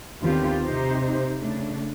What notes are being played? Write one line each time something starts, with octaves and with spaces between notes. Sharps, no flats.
D#2 D3 B3 C4 F4 G4
C3 D#4 G4 C5
C#3 A3 D4